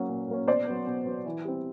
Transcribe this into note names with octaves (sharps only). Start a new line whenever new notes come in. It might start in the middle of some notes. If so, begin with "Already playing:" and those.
Already playing: F#3 A#3 C#4
A#2
F#3 A#3 C#4
B2 C5 D5
F#3 B3
B2
F#3 B3
E3
G3 C4